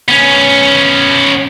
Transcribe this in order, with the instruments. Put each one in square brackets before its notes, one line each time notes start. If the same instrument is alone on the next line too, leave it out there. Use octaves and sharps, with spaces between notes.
[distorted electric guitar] B3 C#4